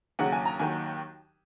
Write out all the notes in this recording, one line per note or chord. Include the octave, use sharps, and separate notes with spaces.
D#2 C#3 F#3 F#5
G#5
A#5
D#2 D#3 F#3 G#5